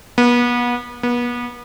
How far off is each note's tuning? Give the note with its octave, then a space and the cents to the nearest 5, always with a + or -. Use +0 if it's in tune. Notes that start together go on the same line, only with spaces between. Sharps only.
B3 -35
B3 -35